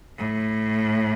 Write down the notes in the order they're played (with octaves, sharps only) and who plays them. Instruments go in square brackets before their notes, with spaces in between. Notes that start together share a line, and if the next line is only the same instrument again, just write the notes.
[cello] A2